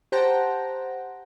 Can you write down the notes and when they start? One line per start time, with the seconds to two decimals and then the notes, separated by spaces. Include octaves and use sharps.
0.12 G4 C5 F#5 G5 A5 A#5